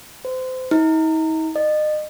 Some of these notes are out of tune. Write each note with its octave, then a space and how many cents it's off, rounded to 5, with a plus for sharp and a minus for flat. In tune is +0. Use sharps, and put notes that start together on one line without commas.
C5 -30
D#4 +45
D#5 -35